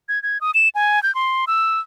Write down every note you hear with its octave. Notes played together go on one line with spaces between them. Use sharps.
G#6
G#6
D#6
E7
G#5
G6
C6
E6